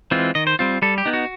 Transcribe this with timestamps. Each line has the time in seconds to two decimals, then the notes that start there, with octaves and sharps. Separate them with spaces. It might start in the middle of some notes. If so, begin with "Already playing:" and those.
0.11 E3 G#3 C4 F4
0.35 D#3 D#5
0.47 C5
0.59 G3 C4 F4
0.82 G3 A4
0.98 G4
1.06 B3 D#4
1.13 F#4